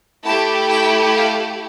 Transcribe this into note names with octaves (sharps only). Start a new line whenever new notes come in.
A3 E4 G4 A5
G5
F5